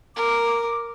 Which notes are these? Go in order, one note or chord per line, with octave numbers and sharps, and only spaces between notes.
A#4 D6